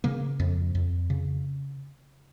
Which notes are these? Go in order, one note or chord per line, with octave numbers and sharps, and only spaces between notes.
C#3 A#3
F2
F2
C#3